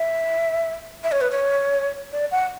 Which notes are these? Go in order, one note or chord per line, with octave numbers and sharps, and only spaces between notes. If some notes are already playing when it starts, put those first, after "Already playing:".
Already playing: E5
E5
C#5
B4
C#5
D5
F#5